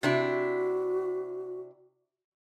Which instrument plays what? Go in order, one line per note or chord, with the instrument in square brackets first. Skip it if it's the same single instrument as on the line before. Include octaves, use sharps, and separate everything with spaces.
[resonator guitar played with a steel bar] C3 D4 E4 [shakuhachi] F#4